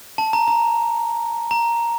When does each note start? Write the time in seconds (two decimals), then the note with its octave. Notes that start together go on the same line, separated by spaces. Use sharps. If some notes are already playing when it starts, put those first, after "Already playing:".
0.18 A5
0.33 A#5
0.48 A#5
1.51 A#5